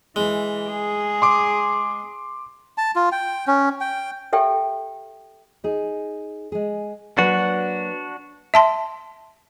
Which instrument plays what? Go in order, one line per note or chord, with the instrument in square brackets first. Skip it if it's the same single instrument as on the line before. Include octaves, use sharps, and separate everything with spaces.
[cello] E3 [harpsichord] G#3
[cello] G#4
[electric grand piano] C6 D6
[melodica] A5
F4
G5
C#4
G5
[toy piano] G4 A4 E5 G5
[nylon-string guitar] D#4 G#4
G#3 G#4
[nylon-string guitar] F#3 A#3 B4 [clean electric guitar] D4 F#4
[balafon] E5 A5 C6